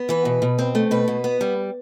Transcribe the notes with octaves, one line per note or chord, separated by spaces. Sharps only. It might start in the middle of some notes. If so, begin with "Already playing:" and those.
Already playing: B3
E3 B4
B2
B2
C4
A3
B2 B4
B2
B3
G3